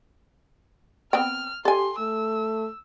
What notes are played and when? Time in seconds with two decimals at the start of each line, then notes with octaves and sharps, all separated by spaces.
1.13 B3 C4 G5 F6
1.65 G4 A4 G#5 C6
1.99 A3 E6